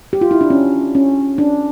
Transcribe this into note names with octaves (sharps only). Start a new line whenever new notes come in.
G4
F4
E4
D4
C#4
C#4
D4